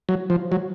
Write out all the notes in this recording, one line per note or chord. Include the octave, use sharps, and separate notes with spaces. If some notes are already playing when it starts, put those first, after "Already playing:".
F#3
F3
F#3